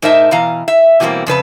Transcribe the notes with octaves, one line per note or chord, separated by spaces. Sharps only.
G#2 D#4 A#4 C5 E5 A5
B2 E3 F5 A#5
E5
B2 E3 G3 G#3 A#3 C4
F2 C#3 B4 A5